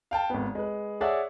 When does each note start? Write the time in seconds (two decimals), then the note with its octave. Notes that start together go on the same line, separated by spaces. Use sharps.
0.11 F5 G5 A5
0.30 G#1 B3
0.55 G#3 B4
1.01 G#4 C#5 D5 E5 F#5